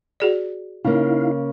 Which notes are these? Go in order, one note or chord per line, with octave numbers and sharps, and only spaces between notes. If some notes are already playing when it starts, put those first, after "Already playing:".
F#4 G#4 D5
C#3 A#3 D#4 E4 F5